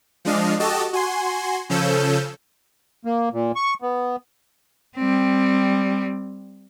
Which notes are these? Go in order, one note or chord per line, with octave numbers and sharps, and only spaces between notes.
F3 G#3 D4 D#5 F5
F#4 G4 A4 D#5 A5
F#4 G#5 C6
C#3 F3 C#4 A4 E6 G6
A#3
A#2
C#6
B3
G3 C4